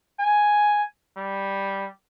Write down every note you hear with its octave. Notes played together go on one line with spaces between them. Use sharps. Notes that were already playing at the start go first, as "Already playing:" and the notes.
G#5
G3